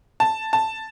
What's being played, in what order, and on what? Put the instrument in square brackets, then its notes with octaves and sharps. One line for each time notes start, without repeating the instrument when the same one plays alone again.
[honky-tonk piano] A5
A5